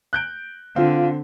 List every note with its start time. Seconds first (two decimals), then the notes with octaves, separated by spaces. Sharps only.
0.13 F#6 G6 D7
0.76 D3 C4 F4 F5